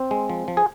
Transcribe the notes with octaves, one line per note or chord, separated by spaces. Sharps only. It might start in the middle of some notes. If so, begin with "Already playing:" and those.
Already playing: C4 C5
G#3
F3
F3
G#4